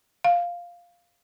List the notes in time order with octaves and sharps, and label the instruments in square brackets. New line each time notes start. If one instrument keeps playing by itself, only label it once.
[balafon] F5